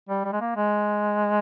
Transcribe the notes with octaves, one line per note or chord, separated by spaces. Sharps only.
G3
G3
G#3
A#3
G#3